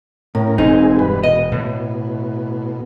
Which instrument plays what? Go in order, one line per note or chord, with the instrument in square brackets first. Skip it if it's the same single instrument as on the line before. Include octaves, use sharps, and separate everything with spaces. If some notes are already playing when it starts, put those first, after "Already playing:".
[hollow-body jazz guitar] A2 [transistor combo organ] C#4 A#4
[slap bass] E1 G#3 [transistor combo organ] C4 G#4 [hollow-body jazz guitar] D#4
[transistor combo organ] G2 B4
[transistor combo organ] B2 [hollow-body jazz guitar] D#5
[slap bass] A2